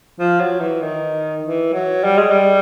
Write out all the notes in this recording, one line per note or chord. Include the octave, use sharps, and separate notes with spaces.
F3
F#3
E3
D#3
E3
F#3
G3
G#3
G3